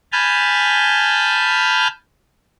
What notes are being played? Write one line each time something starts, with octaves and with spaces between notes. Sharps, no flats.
G#5 A5 B5 F6 G6